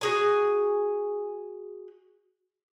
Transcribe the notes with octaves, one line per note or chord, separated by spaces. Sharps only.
F#4 G#4 G#5